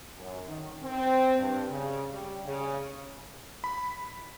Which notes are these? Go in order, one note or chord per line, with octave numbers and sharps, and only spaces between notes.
F#2
D#3
C4
G2
C#3
G3
C#3
B5